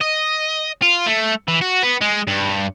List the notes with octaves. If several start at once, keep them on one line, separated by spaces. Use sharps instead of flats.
D#5
F4
A3
E3
F#4
B3
G#3
G2